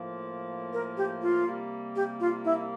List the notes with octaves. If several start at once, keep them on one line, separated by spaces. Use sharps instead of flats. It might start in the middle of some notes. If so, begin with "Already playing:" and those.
Already playing: A2 F3 A#3
A#4
G4
F4
C3 G3 A#3
G4
F4
E4